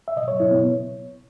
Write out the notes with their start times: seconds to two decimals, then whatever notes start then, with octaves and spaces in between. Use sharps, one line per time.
0.08 E5
0.16 B2 D#5
0.28 C#5
0.31 F#3
0.40 E4
0.48 B2 B3